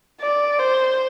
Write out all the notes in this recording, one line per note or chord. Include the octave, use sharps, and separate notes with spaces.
D5
C5